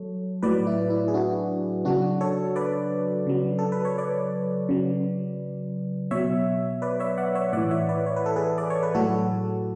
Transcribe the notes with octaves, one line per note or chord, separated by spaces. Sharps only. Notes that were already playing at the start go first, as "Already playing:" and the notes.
Already playing: F#3 A4 C#5
A2 F#3 B4 D5
E4
E4
G#4
D4 F#4
C#3 F#3 D4 F#4
A4 C#5
B4 D5
C#3 F#3
A4
B4
C#5
B4 D5
C#3 F#3
B2 F#3 C#5 E5
B4 D5
C#5 E5
D5 F#5
C#5 E5
A2 E3 D5 F#5
C#5 E5
B4 D5
C#5
B4
A4
G#4 B4
D5
C#5
B4
A2 F#3 F#4 A4